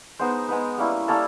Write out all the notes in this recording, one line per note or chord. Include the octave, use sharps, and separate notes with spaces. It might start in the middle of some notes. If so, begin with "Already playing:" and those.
G#3 B3 D#4 C5
G#3 B3 D#4 B4
G3 A#3 C#4 E4
G3 A#3 C#4 E4 A4